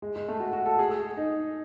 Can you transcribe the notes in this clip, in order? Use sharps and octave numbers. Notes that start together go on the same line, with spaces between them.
G#3
G#3
A3
F#4
F#4
A4
G#4
G#4
D#4